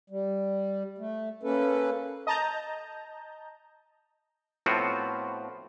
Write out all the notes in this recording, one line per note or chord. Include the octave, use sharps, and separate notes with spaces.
G3
A3
A#3 C#4 A4 B4
D#5 A5 A#5 G6
A2 F3 B3 C4 F4 F#4